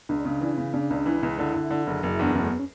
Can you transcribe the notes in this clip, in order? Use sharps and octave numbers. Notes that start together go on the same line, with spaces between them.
C#2 D4
C#3
E3
C#3
C#3 D4
C#2
E3
C#2
D3 E4
D3
D3
F#1
F#1 D4
E4
E2 D4
F#1 C#4
A3
B3
C#4